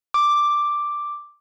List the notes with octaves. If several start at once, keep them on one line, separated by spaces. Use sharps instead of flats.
D6